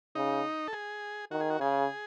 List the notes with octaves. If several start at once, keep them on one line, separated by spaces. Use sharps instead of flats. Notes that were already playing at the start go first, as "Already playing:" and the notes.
C#3 D#4
A4
G#4
D#3 F#4
G#4
F#4
C#3 G#4